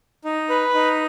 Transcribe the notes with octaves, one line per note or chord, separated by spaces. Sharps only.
D#4
B4
D#4